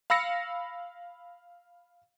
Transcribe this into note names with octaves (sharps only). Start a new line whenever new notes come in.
F5 B5 E6 A#6 C#7